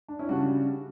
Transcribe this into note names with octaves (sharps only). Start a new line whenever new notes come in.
D4
C#4 E4
C#3 G3 D4 F#4